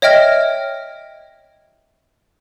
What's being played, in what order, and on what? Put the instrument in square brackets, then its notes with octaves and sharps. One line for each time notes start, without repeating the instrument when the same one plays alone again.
[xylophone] C#5 D#5 E5 G5 F6 A#6